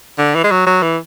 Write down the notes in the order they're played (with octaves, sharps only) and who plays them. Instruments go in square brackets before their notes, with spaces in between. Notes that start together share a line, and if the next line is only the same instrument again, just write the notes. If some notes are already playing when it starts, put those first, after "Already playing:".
[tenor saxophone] D3
E3
G#3
F#3
F#3
E3